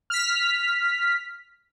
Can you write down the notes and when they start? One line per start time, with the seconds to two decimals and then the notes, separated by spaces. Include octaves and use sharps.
0.10 F6 B6